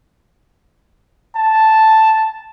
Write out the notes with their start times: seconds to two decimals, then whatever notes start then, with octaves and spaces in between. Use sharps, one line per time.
1.36 A5